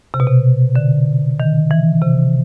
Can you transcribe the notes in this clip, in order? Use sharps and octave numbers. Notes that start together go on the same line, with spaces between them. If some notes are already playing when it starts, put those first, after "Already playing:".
C3
B2
C3
D3
D#3
E3
C3